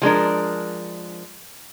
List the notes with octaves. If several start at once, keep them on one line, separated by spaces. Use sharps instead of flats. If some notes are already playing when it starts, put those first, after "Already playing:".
F3 G#3 D4 A#4